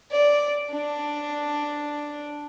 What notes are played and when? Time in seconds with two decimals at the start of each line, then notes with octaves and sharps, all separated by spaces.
0.12 D5
0.72 D4